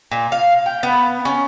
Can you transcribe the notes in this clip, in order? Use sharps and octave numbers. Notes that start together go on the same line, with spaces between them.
A#2
F5
G5
B3
C#4